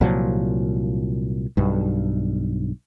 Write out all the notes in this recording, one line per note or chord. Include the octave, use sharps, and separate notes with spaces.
C2 A#2 F3 F#3
B1 G2